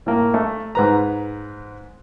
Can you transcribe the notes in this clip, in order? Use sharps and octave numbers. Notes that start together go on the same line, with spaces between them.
A2 A#3
A3
G#2 B4 A#5